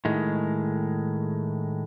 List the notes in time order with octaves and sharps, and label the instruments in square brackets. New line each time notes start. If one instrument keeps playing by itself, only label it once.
[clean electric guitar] A2 D#3 G#3